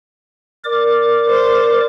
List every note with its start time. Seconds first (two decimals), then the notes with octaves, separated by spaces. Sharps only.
0.65 A#4 D5 D6
1.29 C5